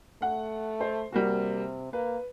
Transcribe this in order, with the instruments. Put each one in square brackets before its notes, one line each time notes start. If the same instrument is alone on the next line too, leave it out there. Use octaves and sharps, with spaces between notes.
[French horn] A3 [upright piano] F#5
[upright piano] C5
[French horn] C3 [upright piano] G3 A#3 F#4
[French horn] A#3 [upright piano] B4